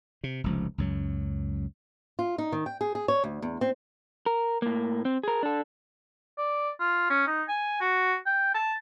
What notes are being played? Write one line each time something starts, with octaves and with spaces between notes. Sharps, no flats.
C3
F1 C#2 F3
C#2 F#2 F#3
F4
D#4
D#3
G5
G#4
G#4
C#5
D2
E2
C4
A#4
A2 A#3
C4
G#4 A#4
D4 A4
D5
F4
C#4
D#4
G#5
F#4
G5
A5